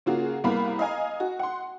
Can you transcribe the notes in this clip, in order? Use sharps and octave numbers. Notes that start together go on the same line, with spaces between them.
C#3 A#3 F4 F#4 G#4
C2 A#3 B3 F5 B5
D#5 F5 G#5 A#5
F#4
F#5 C6